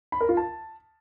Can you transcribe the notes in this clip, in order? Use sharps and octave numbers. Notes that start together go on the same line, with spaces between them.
B5
A#4
F4
A5